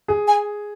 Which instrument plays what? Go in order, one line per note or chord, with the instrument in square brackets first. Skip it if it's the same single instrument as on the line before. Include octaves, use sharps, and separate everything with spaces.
[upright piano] G#4
[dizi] G#5